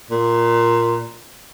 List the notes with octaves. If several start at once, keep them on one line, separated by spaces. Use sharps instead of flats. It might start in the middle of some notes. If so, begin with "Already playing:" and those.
A#2